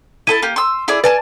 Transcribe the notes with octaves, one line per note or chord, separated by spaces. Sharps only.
E4 A4 A5 D#7
A#3 G4
C6 E6
E4 G#4 D5
B4 D5 G#5 A5